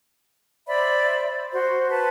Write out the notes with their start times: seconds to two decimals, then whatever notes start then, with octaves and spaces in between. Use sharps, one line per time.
0.67 C5 D5 E5 B5
1.52 F#4 C5
1.90 B4 A5